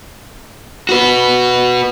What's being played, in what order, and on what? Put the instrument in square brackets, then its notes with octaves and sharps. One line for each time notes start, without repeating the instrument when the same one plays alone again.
[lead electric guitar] F#4 B4